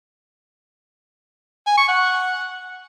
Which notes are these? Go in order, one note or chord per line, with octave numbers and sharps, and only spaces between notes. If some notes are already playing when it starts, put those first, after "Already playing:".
G#5
C#6
F#5